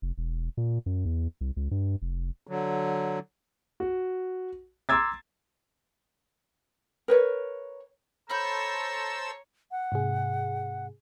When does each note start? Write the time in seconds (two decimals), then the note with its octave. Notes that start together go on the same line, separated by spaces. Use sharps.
0.02 F1
0.18 E1
0.57 A#2
0.86 F#2
1.05 E2
1.41 C2
1.57 C#2
1.71 G2
2.02 F1
2.47 D3 F#3
3.80 F#4
4.89 A#5 C6 D6 E6 G#6 A6
7.08 A#4 B4 C#5
8.30 A4 C5 C#5 A#5 B5 E6 F6 G6
9.71 F#5
9.92 G#2 C3 G#4